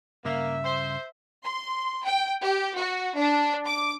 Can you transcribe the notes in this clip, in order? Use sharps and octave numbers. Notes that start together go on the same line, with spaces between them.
G2 C#3 A#3 E5
C5
C6
G5
G4
F#4
D4
D6